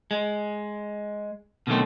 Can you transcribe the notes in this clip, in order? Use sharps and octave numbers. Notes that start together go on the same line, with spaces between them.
G#3
B2 D3 D#3 F#3 A3 C4